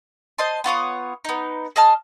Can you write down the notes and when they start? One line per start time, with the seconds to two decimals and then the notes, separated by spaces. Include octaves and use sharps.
0.38 C5 D#5 A5 C6
0.64 B3 F4 C#5 D#6
1.25 B3 D#4
1.76 G#4 D#5 A5 F6